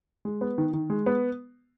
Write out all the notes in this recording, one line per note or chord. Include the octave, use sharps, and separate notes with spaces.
G#3
B3
D#3
D#3
G#3
B3